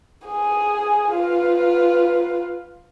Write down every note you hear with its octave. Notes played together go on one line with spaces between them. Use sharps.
G#4 G#5
F4 B4